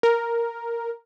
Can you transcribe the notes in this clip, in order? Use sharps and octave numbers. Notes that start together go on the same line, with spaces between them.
A#4